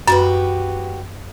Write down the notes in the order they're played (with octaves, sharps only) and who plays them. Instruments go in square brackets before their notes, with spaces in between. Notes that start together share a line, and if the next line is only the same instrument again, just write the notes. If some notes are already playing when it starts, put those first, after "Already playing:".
[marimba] F#2 [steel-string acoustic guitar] F#4 G4 B4